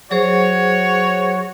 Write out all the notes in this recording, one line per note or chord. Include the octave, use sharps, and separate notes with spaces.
F#3 F#4 G#4 C5 C#5